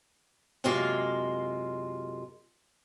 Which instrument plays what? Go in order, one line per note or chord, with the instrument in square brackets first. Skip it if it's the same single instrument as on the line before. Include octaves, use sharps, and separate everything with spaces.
[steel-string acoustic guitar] F#2 C3 G#3 A#3 F4